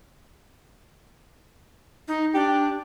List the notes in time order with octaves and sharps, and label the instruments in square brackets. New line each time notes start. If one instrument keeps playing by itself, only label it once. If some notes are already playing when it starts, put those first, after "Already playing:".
[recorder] D#4
[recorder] D4 [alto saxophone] G4